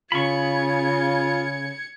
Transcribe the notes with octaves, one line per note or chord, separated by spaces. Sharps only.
C#3 F4 B5 C#6 G#6 C#7